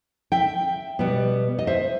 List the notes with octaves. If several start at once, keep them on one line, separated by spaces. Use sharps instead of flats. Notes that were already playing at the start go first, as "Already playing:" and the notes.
E5 G5
B2 G3 B3
D#5
C5 E5